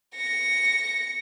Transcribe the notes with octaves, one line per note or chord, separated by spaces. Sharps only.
A#6 C#7